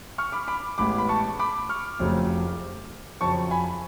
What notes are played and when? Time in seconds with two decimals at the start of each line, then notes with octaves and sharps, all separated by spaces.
0.18 C#6 F6
0.32 B5 D6
0.48 B5 D6
0.78 A1 A2 G#3 B3 B5 D6
0.98 B5
1.09 A5 C#6
1.39 B5 D6
1.69 C#6 F6
1.99 F1 F2 C#3 F#3 A3
3.21 F2 C#3 F#3 A5 C#6
3.51 G#5 B5